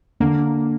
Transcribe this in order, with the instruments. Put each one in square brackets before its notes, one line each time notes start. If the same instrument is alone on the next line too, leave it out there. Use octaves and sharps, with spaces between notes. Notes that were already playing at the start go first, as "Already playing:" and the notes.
[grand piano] D3 [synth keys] A#3